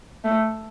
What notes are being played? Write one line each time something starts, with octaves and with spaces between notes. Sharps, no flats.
A3